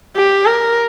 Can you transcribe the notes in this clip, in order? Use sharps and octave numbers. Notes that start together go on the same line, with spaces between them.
G4
A#4